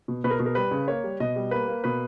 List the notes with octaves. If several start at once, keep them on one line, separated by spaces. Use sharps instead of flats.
B2
B2 B4
A#4
B2
A#4
G3 B4
C#3
A#3 C#5
G3
B2 D#5
G3
A#3 B4
A#3
B2 B4